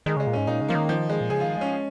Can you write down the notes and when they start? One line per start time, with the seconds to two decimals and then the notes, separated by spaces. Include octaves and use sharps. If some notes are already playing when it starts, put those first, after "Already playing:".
0.06 D#3 G#3
0.17 C#3 G#3
0.27 A#2
0.33 G#2 C#4
0.47 A#2 D#4
0.61 C#3
0.68 F3 A#3
0.75 D#3
0.89 F3
1.09 G#3
1.21 A#2
1.30 C#3 G#4
1.40 F4
1.44 D#3
1.57 G#3 C#4